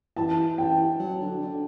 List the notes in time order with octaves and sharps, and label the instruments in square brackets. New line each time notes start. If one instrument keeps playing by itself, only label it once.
[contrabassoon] E3 [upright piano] A5
[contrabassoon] E3 [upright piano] G5
[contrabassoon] F#3
D3
D3